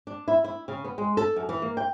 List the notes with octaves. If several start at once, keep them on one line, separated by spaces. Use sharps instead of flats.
D4
E4
E4
C#3
B3
G#3
A4
F#2
E3
A#3
G5